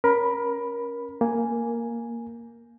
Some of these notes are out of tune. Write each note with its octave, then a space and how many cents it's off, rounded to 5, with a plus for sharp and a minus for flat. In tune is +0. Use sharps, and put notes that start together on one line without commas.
C#4 +0 A#4 +25 B5 +0
A#3 +0 G#5 +0